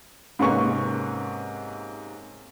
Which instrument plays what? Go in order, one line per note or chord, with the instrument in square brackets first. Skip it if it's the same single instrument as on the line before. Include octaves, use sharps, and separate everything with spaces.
[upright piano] G#2 C3 A#3 C#4 B4 C#6